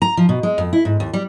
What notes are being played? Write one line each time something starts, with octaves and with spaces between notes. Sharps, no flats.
A#5
F3
B2
G#3
F2
E4
G#2
D#2
G3